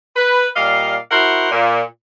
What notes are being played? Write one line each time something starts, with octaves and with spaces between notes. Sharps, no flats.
B4
A#2 G3 D5 D#5 F5
E4 F#4 A#4 C5 F#5
A#2